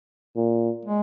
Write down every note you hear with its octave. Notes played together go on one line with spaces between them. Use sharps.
A#2
G#3